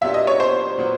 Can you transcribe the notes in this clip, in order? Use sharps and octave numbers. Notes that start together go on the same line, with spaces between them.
A#2 F#3 B3 D4 G4 E5
D#5
C#5
C5
A#2 F#3 B3